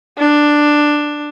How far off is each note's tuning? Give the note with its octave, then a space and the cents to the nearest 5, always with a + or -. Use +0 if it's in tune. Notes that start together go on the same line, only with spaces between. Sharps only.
D4 +5